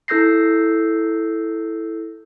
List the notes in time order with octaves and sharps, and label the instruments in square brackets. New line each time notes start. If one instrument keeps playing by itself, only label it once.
[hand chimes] E4 A4 E6 G6 A#6 C7